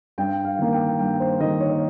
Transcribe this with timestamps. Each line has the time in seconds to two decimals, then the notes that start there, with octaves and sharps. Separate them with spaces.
0.18 G2 G5
0.45 F5
0.59 D#3 A#3
0.73 G5
0.99 G2 G5
1.20 C5
1.40 D#3 A#3 D#5
1.61 C#5